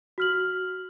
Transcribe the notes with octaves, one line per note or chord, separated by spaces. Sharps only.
F#4 F6 F#7